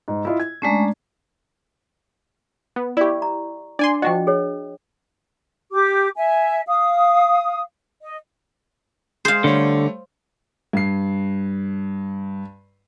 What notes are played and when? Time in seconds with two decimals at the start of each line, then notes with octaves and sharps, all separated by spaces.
0.08 G#2
0.25 E4 F4 D#5
0.40 G#6
0.62 G#3 A3 C#4 D4 D5 A#5
2.76 B3
2.97 E4 G4 D5 C#6
3.22 A#5
3.79 D4 D5 G#5 C6
4.02 F3 D4 F#4 D#5 G5
4.27 G#4 C#5
5.72 G4 D6
6.16 E5 G#5
6.67 F5 D#6
8.01 D#5
9.25 G#3 G#4 C5 F5
9.44 D3 G3 A3 C#5
10.73 G2 C7